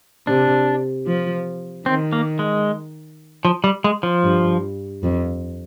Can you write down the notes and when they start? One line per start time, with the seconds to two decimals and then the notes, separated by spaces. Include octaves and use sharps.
0.27 C3 D4
1.06 F3
1.86 D#3 C4
2.13 A#3
2.39 G#3
3.45 F3
3.64 G3
3.84 G#3
4.03 F3
4.23 G2
5.03 F2